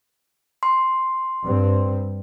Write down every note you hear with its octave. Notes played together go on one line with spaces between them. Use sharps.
C6
G2 C4